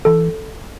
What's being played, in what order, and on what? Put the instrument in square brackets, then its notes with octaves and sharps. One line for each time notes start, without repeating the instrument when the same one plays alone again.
[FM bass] E3 [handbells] A4